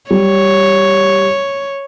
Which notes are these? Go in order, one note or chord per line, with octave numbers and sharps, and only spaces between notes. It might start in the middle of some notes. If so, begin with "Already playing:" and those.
G3 C#5